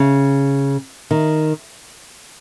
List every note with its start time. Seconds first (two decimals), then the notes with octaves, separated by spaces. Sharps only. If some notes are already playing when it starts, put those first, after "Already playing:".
Already playing: C#3
1.11 D#3